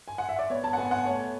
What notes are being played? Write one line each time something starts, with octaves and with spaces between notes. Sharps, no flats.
G#5
F#5
E5
D5
B3 C#5
A5
F#5
B3 G#5
F#5
A3 C#5